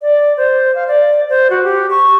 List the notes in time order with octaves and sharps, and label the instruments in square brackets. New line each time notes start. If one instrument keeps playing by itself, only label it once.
[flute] D5
C5
F5
D5
C5
F#4
G4
C#6